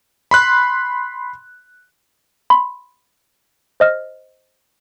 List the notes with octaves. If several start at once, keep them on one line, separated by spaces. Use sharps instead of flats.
B5 C6 F#6
B5 C6
C5 D#5 F6